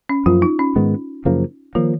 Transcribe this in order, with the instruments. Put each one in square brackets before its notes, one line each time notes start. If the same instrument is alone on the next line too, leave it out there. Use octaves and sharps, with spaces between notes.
[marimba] C#4
[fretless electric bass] F#2 F3 A#3 [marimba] F4
[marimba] D#4
C#4
[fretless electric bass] G#2 D#3 G#3 B3
F#2 C#3 F3 A#3
[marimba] D#3 [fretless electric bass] F3 A#3